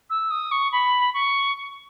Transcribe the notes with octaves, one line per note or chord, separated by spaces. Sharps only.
E6
D#6
C#6
B5
C#6